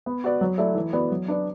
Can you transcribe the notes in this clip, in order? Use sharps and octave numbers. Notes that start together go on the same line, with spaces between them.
B3
F#4 B4 D5
F#3
A3 E4 A4 D5
E3
B3 F#4 B4 D5
F#3
D4 B4 D5